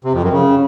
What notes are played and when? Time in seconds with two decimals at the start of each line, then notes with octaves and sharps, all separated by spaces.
0.04 C3
0.14 F2
0.23 F#2
0.33 C#3